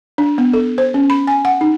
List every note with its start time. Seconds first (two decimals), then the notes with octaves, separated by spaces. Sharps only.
0.18 D4
0.38 B3
0.53 A4
0.78 C5
0.94 C#4
1.10 B5
1.27 G#5
1.45 F#5
1.61 D#4